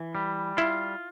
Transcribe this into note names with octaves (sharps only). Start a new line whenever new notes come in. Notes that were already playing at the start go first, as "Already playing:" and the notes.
Already playing: E3
G3
E4 F4